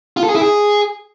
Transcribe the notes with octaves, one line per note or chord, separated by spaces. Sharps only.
F4
A4
G#4
E4
G#4